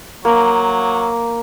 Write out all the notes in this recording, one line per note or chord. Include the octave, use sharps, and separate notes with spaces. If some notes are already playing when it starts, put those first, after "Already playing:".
F#3 A#3